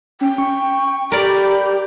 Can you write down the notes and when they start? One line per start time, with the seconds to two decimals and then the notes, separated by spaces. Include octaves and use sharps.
0.21 C#4 G5
0.38 C#6
1.12 G4 A#4 D5 B5